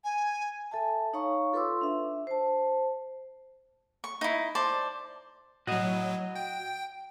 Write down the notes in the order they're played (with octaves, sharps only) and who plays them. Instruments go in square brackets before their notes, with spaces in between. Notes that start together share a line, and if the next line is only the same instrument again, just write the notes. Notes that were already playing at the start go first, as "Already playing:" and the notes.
[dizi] G#5
[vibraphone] A4 E5 G#5 A5
D#4 C#5 F5 A#5 C#6
F4 A4 B4 C6 D6 E6
D4 E5
C5 A5
[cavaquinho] C#6
D#4 E4
C5 D5 A5
[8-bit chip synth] A2 F#3 [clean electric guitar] F#4 D#5
[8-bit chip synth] G5